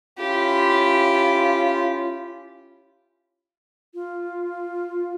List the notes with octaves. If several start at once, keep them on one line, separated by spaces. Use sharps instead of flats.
C#4 E4 F4 G4 B5
F4